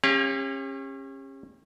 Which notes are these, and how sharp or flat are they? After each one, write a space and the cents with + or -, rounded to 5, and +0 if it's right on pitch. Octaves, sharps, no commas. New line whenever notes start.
C#4 -30 G4 +40 F5 +0